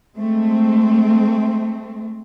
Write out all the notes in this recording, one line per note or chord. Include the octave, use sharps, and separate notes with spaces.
G#3 A3 C4